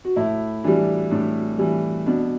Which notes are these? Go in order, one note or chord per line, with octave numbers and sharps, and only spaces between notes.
F#4
A2 E4
E3 G3 D4
A2 D4
E3 G3
B2 D4